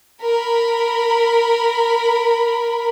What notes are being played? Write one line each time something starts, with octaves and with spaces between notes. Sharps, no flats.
A#4 B5